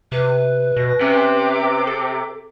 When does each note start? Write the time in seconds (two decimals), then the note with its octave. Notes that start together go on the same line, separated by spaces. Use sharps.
0.12 C3 B4
0.77 B2 A#6
1.01 C3 C#4 D6
1.87 A4